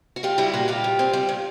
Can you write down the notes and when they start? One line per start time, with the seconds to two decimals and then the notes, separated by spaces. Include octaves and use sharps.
0.16 F#4
0.23 G3 F4 G4
0.38 G3 E4 F#4
0.53 A#2 F#4 G#4
0.68 G3 F4 G4
0.84 A#2
0.99 C4
1.13 G3
1.29 A#2